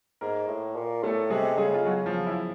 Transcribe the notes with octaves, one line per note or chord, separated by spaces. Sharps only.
G#2 A#3 A#4
A2
A#2
A2 A3 A4
C3 G#3 G#4
C#3 G#3 G#4
F4
F#3 F#4
F3 F4
E4